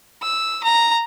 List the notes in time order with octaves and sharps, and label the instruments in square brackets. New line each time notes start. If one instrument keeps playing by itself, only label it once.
[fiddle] E6
A#5